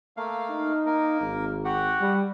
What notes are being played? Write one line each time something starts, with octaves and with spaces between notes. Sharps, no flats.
A3 A#3 F5
D#4
A#3 A#4
G#1
F#4 G4 F#5
G3